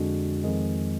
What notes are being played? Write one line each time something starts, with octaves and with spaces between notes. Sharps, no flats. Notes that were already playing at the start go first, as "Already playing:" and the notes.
Already playing: F2 D3 G#3 D4 F#4
F2 D#3 G#3